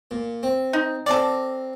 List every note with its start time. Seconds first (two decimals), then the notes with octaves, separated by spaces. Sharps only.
0.11 A#2
0.43 C4
0.73 D#4
1.06 C4 A4 D5 F5 A#5